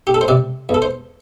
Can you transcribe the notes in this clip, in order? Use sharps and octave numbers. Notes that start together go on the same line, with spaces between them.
G4
A4
C5
C3 D5
E2
A4
C5